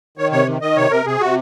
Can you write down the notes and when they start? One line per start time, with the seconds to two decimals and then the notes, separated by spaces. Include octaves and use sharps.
0.18 D#3 C#5
0.32 C3 C#5
0.47 D#3
0.61 D#3 D#5
0.76 C3 C#5
0.91 C3 A#4
1.06 C3 G#4
1.20 C3 F#4